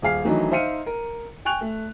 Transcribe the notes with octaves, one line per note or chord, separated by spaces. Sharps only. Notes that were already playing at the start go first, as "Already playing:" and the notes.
D#1 G#4 F5 C7
D#3 E3 F#3 A3 D4 D#4
D#4 C5 E5 F5 C#7 D#7
A#4
G5 G#5 C#6 F#6 F7
A3